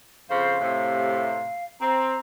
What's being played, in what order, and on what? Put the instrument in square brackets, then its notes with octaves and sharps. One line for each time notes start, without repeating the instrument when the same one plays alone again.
[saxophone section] F2 C#3 C5 [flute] F5
[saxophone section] A2 C3
[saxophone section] C4 [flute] A#5